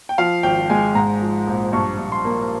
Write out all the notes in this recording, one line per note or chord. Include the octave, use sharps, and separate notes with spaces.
G5
F3 F5
G#1 G5
G#3 G#5
G#2 A#5
F3
A#1
G2 C#6
G2
C6
A#3